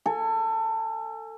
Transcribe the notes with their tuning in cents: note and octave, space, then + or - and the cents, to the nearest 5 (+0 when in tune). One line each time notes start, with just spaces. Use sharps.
A4 +25 G#5 +0